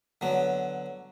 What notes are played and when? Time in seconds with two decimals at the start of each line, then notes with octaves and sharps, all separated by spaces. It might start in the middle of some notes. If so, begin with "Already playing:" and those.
0.21 D3 F#3 B3